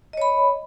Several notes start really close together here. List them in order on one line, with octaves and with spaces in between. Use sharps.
D#5 C#5 B5